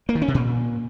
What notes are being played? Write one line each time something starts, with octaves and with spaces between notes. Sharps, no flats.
A#3
D#3
C#4
C3
A#2